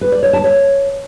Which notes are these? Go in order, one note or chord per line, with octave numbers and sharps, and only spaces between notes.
B4
D5
C#5
A5
C#5